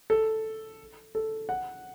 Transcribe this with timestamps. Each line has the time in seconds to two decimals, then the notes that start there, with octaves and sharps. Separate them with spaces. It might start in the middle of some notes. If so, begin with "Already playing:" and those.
0.10 A4
1.15 A4
1.49 F#5